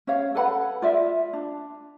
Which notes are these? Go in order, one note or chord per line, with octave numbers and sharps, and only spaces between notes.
C#4 C#5 F5
A4 B4 F#5 B5
F4 D5 E5
D4